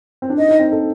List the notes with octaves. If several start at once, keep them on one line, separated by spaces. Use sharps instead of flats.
C4
D4
D#4 D#5
D#4
C4
A4